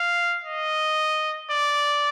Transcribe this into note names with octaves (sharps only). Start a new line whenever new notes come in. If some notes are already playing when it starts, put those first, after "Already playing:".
Already playing: F5
D#5
D5